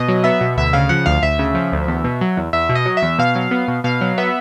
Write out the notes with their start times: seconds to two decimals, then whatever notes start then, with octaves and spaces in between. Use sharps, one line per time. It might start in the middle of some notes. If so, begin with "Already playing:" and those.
Already playing: B2 D#5
0.08 F#3
0.24 B3 E5
0.41 B2
0.57 D2 E5
0.73 C#3 F5
0.89 F3 F#5
1.06 D2 F5
1.22 D2 E5
1.39 C#3
1.55 F3
1.72 D2
1.88 E2
2.04 B2
2.21 F#3
2.37 E2
2.53 E2 E5
2.69 B2
2.75 D#5
2.86 F#3
2.97 E5
3.03 E2
3.19 B2 F5
3.35 F#3
3.51 B3
3.68 B2
3.84 B2 F5
4.01 F#3
4.18 B3 E5